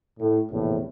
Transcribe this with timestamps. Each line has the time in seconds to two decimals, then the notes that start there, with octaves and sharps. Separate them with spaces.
0.19 A2
0.51 A#1 E2 A2 C3